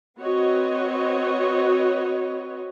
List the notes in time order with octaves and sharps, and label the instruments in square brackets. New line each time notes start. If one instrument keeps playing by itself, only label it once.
[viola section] C4 F#4 B4 C#5 D#5